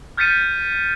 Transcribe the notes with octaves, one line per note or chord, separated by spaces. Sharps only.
F6 G6 A6 B6 C#7 D#7